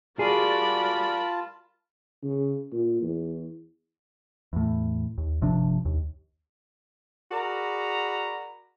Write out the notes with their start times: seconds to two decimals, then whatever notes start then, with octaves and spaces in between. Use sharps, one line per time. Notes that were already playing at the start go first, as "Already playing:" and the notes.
0.19 G3 F4 F#4 G#4 A#4 D5 A5 B5
2.24 C#3
2.72 A#2
3.01 E2
4.53 E2 A2
5.18 D#2
5.41 G1 C3 F3 D4
5.85 D#2
7.32 F#4 G#4 A#4 D5 A#5 B5